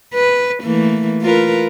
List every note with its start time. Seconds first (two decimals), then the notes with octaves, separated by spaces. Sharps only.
0.13 B4
0.63 E3 A3 A#3
1.22 F4 A#4 B4